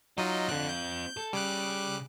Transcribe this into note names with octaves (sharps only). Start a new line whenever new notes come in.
F#3 D#4 F4 D#5
D3 C4 F4 F#6
G6
A4
C#3 G3 D6 F#6